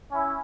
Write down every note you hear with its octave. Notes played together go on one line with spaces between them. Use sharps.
C#4 E4